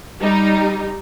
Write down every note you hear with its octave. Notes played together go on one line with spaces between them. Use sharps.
G3 D#4